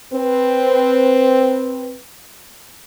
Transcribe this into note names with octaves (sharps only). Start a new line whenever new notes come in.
C4 B4